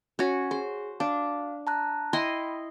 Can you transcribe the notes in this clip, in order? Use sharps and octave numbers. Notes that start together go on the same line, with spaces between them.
C#4 F#4
G#4 C5
D4 F5
A5 A#5 F#6
E4 D#5 G5 B5 C6